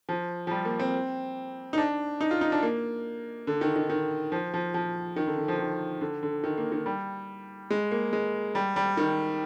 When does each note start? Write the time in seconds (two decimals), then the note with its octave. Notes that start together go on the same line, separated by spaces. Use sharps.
0.09 F3
0.47 F3
0.51 G3
0.65 A#3
0.79 C4
1.73 D#4
1.78 D4
2.21 D#4
2.31 F4
2.41 D#4
2.52 D4
2.63 A#3
3.47 D3
3.61 D#3
3.76 D#3
3.90 D#3
4.32 F3
4.54 F3
4.74 F3
5.16 D#3
5.27 D3
5.38 D3
5.48 F3
5.59 D#3
6.01 D3
6.23 D3
6.44 D#3
6.58 A#3
6.72 D#3
6.86 G3
7.70 G#3
7.91 A#3
8.13 G#3
8.55 G3
8.76 G3
8.97 D#3